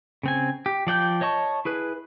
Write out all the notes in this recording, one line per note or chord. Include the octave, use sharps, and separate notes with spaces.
C#3 C4 G#5
G4
F3 D5 G5 G6
C#5 D#5 A5 C#6
E4 G#4 B4